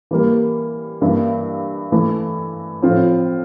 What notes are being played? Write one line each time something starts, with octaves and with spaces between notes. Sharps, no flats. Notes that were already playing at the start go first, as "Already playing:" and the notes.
E3 G3 A#3
G2 E3 A#3 E4
E3 A3 E4
A2 F3 C4 F4